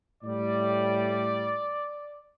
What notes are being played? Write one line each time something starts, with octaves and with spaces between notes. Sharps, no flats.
A2 G3 D5